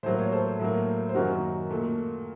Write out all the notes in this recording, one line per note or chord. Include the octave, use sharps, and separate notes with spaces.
A2 F#3 A#3 C5
C#5
A4 C5
A2 F#3 A#3
C5
F#2 D#3 F#3 A#3 F#4 A#4
A#2 A3